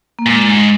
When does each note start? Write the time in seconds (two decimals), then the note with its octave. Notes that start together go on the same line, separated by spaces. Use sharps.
0.19 A#3
0.26 A#2 G#3
0.49 G#2